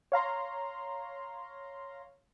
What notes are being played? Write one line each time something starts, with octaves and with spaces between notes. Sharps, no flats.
C#5 F5 A#5 C6